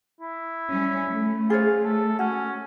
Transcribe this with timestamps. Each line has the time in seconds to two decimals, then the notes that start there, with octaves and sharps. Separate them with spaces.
0.20 E4
0.71 G3 C#4
1.11 A3
1.50 F4 G#4 C5 C#5
1.84 A4
2.19 C#4 F#4